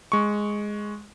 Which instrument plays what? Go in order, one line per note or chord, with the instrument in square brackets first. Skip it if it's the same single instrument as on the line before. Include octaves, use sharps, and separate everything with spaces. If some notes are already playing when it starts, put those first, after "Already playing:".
[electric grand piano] G#3 C#6